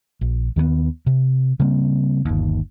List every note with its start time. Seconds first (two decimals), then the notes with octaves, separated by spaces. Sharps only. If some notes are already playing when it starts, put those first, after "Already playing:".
0.21 A#1
0.56 D#2 D#3 A#3 B3
1.06 C3
1.60 C#3 G3 A#3 C4
2.25 G1 D#2